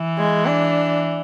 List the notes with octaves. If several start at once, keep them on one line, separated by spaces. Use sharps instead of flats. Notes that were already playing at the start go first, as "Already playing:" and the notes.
Already playing: E3
G#3
D4